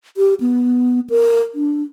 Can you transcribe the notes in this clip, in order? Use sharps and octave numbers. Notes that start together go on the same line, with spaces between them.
G4
B3
A#4
D4